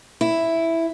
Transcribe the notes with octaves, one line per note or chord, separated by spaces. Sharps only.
E4